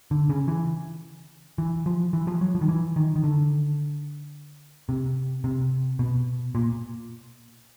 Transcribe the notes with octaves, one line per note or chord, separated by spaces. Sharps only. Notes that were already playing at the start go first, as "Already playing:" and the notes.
D3
C#3
E3
E3
F3
E3
F3
F#3
F3
D#3
E3
D#3
D#3
D3
C3
C3
B2
A#2